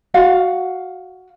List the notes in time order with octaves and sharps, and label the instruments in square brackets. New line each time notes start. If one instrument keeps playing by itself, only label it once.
[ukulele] F#4 F5 F#5